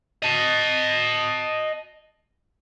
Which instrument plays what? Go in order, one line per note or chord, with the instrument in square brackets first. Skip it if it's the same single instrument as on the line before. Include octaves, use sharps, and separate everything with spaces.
[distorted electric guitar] D#5 A5